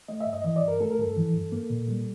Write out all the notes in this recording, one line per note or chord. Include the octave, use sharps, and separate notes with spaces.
A3 D#5
E5
G2
D#5
E3 D#5
D5
G2
A#4
A3 A4
A#4
G2 A4
E3
G2
A#3
A#2
G3